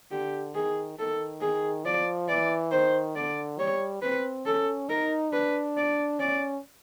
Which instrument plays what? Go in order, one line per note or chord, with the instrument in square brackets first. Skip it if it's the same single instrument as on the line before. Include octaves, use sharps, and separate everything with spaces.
[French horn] D3 [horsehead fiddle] G4
[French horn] D#3 [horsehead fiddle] G#4
[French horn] D#3 [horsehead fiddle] A4
[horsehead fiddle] G#4
[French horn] F3 [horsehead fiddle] D5
[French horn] E3 [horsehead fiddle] D5
[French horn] D#3 [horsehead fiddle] C5
[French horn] D3 [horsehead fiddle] D5
[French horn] G3 [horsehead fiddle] C#5
[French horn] C4 [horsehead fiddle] B4
[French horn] C#4 [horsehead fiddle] A4
[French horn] D#4 [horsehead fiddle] A#4
[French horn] D4 [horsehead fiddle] B4
[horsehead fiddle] D5
[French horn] C#4 [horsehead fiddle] D5